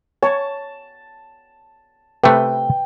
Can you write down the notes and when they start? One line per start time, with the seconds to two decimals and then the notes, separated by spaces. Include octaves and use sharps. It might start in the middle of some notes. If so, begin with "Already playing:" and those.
0.23 C#5 A5
2.24 C3 A3 B4 G5